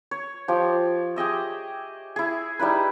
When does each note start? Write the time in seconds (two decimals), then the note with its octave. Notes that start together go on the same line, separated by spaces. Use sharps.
0.11 C#5
0.48 F3 G4
1.16 G4 G#4 D#5 E5
2.16 E4 G#4
2.59 G3 D#4 E4 B4